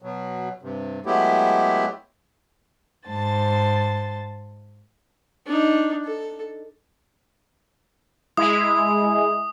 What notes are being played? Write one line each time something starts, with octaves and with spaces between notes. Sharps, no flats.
B2 F#3
G2 C3
F#3 G#3 A3 B3 E4 G4
G#2 C5 A5 A6
D4 D#4
A4
G#3 E4 G#4 D#6